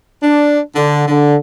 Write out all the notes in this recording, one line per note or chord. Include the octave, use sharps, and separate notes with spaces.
D4
D3
D3